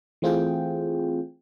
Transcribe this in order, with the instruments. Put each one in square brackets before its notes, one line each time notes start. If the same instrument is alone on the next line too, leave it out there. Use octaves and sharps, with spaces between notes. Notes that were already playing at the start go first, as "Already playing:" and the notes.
[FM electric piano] E3 A3 C4 F4 G#4 G5